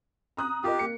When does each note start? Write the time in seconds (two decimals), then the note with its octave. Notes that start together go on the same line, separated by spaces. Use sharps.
0.37 A#5 D#6 F#6
0.64 F4 G4 A#4 D#5
0.79 A#3 C#7